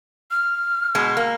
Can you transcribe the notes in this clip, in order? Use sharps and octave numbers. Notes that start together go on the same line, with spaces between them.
F6
B2 G#3
A#3